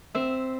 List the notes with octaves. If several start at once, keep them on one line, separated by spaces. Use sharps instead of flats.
C4 E5